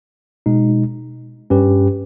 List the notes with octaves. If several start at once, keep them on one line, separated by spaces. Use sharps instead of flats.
B2 G#3 D#4
G2 G3 C#4 G4 B4